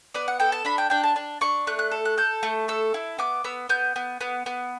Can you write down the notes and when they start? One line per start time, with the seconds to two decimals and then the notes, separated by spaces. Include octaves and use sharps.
0.14 B3 D5
0.28 F#5
0.40 A4 G5
0.52 A5
0.65 D4 B5
0.78 G5
0.90 D4 G5
1.04 A5
1.16 D4
1.41 D4 C#6
1.67 A3 F#6
1.79 F#6
1.91 A4
2.05 F#6
2.18 A4 G6
2.43 A3
2.68 A4 E6
2.94 E4
3.19 B3 D6
3.44 B3 E6
3.69 B3 G6
3.96 B3
4.21 B3
4.46 B3